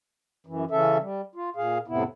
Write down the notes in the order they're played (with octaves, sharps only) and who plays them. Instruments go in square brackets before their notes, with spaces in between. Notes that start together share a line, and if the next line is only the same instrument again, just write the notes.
[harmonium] F#2 E3
C#3 E3 C#4 A4 E5
G3
F4
A#2 G#4 F5
F2 A2 C3 B3 E4